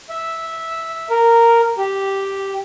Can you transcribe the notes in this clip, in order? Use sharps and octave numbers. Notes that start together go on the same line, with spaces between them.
E5
A#4
G4